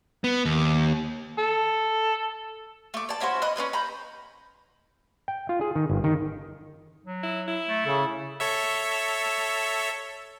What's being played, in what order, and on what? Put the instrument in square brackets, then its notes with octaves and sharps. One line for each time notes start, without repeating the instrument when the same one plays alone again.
[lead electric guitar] B3
D#2
[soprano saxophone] A4
[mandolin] A3 D6
D5 A5
C#4 E4 F#4 C5
D#5 B5 F#6
C#4 D4 B4 D#5
A#5 B5 G6
[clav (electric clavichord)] G5
F4
G#4
D#3
G1
D#3
[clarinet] F#3
[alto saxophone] E4
E4
[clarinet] A3
[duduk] C#3 [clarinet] A4
[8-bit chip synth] A4 C#5 E5